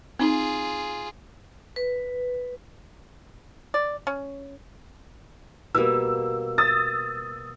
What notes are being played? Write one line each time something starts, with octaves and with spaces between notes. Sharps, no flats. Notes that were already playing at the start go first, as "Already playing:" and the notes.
C4 D#4 F4 G#4
B4
D5
C#4
B2 G3 A#3 E6
D#6 E6 A6